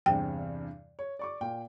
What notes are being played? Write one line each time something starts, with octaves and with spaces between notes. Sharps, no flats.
E2 G2 C3 G5
C#5
D5 C#6 D6
A#2 G5